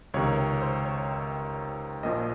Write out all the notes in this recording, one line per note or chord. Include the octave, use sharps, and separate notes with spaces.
C#2 C3 D#3 C#5
C#5
C5
C#5
A#1 A#2 F3 D#5